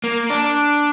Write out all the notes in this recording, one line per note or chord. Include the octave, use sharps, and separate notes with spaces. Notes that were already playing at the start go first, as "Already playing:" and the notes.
A#3
D4